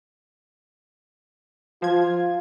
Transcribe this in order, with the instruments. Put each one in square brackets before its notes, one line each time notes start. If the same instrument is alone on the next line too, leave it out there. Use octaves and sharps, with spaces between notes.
[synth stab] F3 G#6 [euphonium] F4